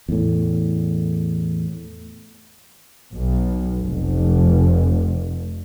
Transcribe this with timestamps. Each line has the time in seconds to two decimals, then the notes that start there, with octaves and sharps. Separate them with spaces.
0.09 E2 A2
3.13 B1
3.79 F1